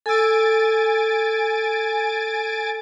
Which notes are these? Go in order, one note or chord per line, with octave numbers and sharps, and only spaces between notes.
A4 G#5 E6 A6 D7